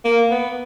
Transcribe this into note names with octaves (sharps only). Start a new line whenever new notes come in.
A#3
B3